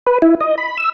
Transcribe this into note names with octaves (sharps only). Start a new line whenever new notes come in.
B4
E4
D#5
B5
E6